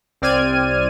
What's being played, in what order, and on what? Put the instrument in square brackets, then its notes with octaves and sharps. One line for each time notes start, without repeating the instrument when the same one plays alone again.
[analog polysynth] C2 C4 D5 F6 G#6 D#7